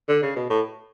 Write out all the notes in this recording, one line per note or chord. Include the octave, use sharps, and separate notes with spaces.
D3
C#3
B2
A2